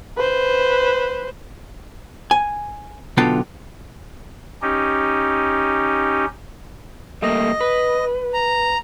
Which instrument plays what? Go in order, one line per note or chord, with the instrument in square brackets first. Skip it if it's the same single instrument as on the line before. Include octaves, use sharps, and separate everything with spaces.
[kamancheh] B4 C5
[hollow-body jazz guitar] G#5
B1 D3 B3 F4 G5 A5
[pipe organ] C#4 D#4 G4
[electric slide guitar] G3 A3 A#3 [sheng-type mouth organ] D#5
[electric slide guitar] B4
[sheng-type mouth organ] A#5